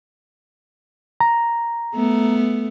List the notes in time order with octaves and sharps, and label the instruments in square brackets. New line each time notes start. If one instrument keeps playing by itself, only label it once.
[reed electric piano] A#5
[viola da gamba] A3 B3